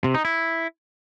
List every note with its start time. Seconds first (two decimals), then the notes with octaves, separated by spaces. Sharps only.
0.04 C3
0.15 D#4
0.25 E4